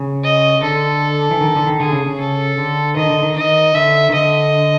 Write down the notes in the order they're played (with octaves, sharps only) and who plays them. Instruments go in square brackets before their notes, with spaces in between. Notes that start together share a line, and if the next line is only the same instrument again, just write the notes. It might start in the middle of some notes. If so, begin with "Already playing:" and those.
Already playing: [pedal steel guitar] C#3
[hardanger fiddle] D#5
[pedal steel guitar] D3 [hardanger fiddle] A4
[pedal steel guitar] E3
D#3
D3
D#3
[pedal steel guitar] D3 [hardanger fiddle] G#4
[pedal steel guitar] C#3
C#3
[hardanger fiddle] A4
[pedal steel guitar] D3
[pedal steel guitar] D#3 [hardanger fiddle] D#5
[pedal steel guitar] D3
D#3
[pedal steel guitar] D#3 [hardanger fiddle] D#5
[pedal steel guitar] D3 [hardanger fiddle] E5
[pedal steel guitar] D#3
[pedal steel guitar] D3 [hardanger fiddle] D#5